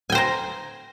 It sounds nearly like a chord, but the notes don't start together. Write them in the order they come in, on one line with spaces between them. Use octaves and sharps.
G#5 G5 C5 A#5